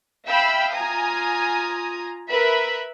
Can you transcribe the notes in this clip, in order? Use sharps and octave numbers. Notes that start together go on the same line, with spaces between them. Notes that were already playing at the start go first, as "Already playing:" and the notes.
E5 F5 G5 B5 E6
F4 G#5 A#5 D#6
A#4 B4 E5 B5